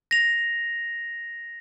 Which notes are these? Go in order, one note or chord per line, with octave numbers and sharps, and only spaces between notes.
A#6 F7